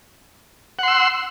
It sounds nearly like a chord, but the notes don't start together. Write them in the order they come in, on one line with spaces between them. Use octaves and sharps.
F#5 C6 E6